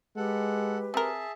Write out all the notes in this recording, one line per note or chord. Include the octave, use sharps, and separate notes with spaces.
G#3 G4 A4 B4 F#5
C4 G#4 A#4 E5 A5